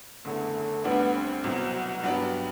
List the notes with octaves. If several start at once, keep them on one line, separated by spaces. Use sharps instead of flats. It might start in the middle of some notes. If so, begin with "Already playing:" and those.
F#1 E2 D3 A3
D2 D3 G3 B3 D4
C4
C2 B2 F#3
F#4
G2 F#3 B3 D4 G4